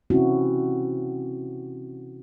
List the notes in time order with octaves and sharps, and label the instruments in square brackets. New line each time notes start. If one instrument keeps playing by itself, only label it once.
[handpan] C3 E3 C4 C#4 E4 F#4